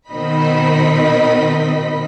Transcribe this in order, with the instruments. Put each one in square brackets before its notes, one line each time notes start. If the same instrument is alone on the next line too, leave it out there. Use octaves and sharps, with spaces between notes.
[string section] B2 D#3 C4 D#5 B5 B6